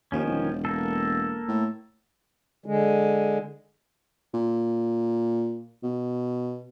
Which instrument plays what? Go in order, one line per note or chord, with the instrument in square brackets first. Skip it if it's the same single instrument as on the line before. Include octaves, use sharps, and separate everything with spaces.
[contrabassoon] D#2 [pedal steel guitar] D#3 F3 C#4
[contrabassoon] E1
[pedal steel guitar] A#3 A4
[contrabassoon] A2
[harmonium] D3 G#3
[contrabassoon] A#2
B2